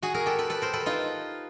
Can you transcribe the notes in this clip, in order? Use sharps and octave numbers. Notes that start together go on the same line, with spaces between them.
F#4 G#4
G#4 A#4
G4 A4
A4 B4
A4 B4
A#4 C5
A4 B4
D#4 F4